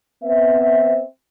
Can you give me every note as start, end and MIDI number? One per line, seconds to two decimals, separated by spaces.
0.23 1.03 59
0.23 1.03 60
0.23 1.03 76